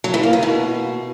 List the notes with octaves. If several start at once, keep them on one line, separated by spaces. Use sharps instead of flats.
F#3
E3
A#3
D#3
B2